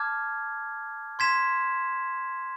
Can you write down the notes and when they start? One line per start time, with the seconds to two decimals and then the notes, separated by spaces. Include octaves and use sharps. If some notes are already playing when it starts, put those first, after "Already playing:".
Already playing: A5 D6 F6 G#6
1.19 C6 G#6 B6 E7